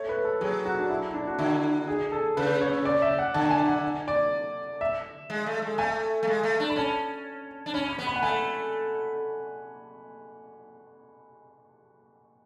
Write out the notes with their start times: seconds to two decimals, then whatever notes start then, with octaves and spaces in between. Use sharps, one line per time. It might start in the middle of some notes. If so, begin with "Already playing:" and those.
Already playing: A3 C#5
0.09 B4
0.25 A4
0.41 F#3 G#4
0.65 F#4
0.79 D4
0.90 E4
1.14 D4
1.27 F#4
1.39 D3 E4
1.88 G#4
2.12 A4
2.37 C#3 B4
2.61 C#5
2.85 D5
3.02 E5
3.19 F#5
3.34 D3 A5
3.51 G#5
3.67 F#5
4.08 D5
4.81 E5
5.30 G#3
5.46 A3
5.62 G#3
5.78 A3 G#5
6.23 A3
6.27 G#3
6.43 A3
6.60 D4
6.70 B5
6.76 C#4 A5
7.66 D4
7.74 C#4 B5
7.90 B5
7.99 B3
8.07 B5
8.16 F#5
8.22 A3 G#5